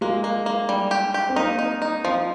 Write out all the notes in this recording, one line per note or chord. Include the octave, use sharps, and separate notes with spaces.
G#3 A#3
A#3
A#3
G3
G4
G4
C4
A#3 D#4
D#4
D#4
F3 C4